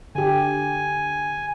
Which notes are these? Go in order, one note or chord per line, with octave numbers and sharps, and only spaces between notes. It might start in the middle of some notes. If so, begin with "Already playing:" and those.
D3 G4 G#5